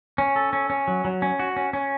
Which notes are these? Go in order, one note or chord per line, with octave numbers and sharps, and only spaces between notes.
C#4
A4
C#4
C#4
F#3
F#3
C#4
F#4
C#4
C#4